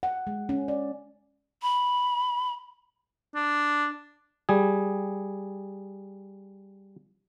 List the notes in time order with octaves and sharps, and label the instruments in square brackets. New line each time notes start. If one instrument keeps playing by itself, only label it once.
[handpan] F#5
G#3
C#4
D5
[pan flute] B5
[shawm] D4
[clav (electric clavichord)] G3 G#4